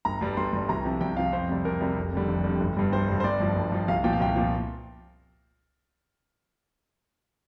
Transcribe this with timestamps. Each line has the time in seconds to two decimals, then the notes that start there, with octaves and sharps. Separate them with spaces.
0.05 G1 A#5
0.21 G2 G3
0.37 G1 C6
0.53 G2 G3
0.69 C2 A#5
0.85 C3 F3
1.01 C2 G5
1.17 C3 F3 F5
1.33 F2 C5
1.49 C3 G3
1.65 F2 A#4
1.81 C3 G3
1.96 F1
2.13 F2 D3 G3
2.28 F1
2.44 F2 D3 G3
2.61 G1
2.77 G2 G3
2.93 G1 C5
3.09 G2 G3
3.20 C5
3.24 G1 D5
3.40 G2 F3
3.56 G1
3.72 G2 F3
3.88 C2 F5
4.04 A#2 F3 G5
4.13 F5
4.20 C2 G5
4.36 A#2 F3